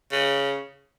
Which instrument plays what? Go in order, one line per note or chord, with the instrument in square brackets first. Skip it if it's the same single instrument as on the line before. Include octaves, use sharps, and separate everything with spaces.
[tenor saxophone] C#3